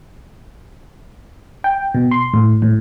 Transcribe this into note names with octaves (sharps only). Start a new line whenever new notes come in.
G5
B2
C6
A2
A2